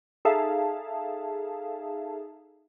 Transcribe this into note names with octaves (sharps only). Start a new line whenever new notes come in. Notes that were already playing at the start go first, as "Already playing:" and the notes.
D#4 G#4 A4 E5 F5 A5